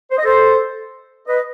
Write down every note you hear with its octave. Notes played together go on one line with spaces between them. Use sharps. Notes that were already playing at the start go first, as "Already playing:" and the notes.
C5
D#5
A4 C5
B4 D#5